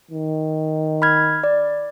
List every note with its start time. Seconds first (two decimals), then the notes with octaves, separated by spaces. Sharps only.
0.11 D#3
1.02 B5 F6 G#6
1.44 D5